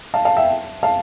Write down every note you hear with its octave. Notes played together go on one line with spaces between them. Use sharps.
F5 A5
F5 A5
E5 G5
F5 A5